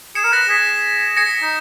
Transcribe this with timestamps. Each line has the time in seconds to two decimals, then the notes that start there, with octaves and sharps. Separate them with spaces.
0.15 G#4 C#7 E7
0.24 A#4
0.32 B4 A#6 C#7
0.49 G#4 B6
1.17 G#4 A#6 C#7
1.43 D#4